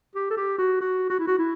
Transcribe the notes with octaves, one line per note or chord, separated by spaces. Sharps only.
G4
A4
G4
F#4
F#4
F#4
E4
F#4
E4